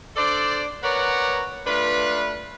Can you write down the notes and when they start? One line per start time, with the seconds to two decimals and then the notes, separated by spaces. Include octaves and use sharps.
0.17 D4 A4 C5 D5
0.84 A#4 B4 C#5 D5 F#5 A#5
1.67 A3 D4 F4 B4